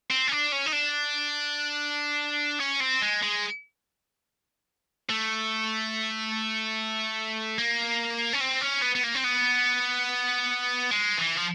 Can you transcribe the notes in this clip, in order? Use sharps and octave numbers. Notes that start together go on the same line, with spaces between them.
C4
C#4
D4
C#4
D#4
D4
C#4
C4
G#3
G#3
A3
A#3
C#4
C4
C#4
B3
B3
A#3
C4
B3
G#3
E3
F3